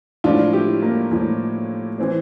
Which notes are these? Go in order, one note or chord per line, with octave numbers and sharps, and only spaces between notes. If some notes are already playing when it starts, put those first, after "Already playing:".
A2 F3 D4 F4
E4 G4
A#3
A2 F3
E3 C4